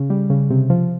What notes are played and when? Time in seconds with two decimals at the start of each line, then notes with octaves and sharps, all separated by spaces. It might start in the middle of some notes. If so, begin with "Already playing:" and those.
Already playing: C#3
0.10 G3
0.30 C#3
0.50 C3
0.70 F3